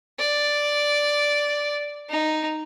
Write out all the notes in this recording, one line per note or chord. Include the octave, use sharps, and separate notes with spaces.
D5
D#4